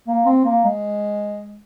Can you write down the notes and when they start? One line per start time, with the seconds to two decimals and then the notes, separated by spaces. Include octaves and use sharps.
0.08 A#3
0.26 C4
0.45 A#3
0.64 G#3